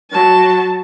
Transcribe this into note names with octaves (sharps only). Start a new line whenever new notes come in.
F#3 A5